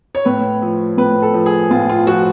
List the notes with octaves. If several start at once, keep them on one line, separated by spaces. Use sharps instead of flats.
C#5
A2 B4
F3
A2 B4
A4
F3
G#4
A2 F4
F4
F3 F#4